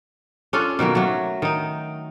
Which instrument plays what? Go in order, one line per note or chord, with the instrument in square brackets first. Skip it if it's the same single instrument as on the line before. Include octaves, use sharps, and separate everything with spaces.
[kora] C#4 D4 F4 A4
B2 D#3 F#3 A#3
F#3 A3
D#3 D#4